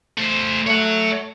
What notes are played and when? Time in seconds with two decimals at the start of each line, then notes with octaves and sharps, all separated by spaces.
0.18 A3 C5
0.67 A3 C#5 F#5